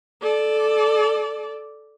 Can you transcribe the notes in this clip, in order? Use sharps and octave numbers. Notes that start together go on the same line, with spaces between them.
A4 D5